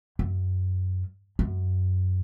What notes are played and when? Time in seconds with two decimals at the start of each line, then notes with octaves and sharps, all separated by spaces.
0.19 F#2
1.39 F#2